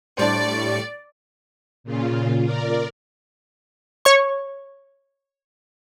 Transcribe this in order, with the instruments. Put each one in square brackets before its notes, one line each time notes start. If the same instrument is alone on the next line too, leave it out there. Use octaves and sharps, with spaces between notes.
[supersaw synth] A2 G3 C#6 [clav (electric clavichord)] D4 C5 [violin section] D5
[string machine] A#2 C#3 F4
A#4 D5
[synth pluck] C#5 C#6